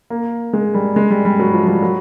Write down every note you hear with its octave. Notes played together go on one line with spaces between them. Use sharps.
A#3
G#3
G3
G#3
G3
G3
F#3
F3
G3
F#3